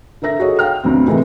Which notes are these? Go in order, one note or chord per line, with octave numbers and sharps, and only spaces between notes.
D3 A#4 E5 A#6
F#4 G#4 A4 C#5 D#5
F5 G5 F6
D2 F#3 B3 C4
A2 C3 E3 G#3 A#3